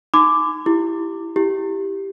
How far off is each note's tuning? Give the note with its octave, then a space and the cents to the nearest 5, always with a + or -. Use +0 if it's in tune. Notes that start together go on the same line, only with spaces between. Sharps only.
D#4 +0 B5 +45 D6 +0
E4 +5 G4 +0
E4 +0 G4 +0